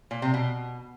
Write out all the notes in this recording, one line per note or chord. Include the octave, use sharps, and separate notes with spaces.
A#2
C3
B2